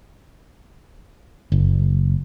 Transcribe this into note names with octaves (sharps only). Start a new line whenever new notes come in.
F#1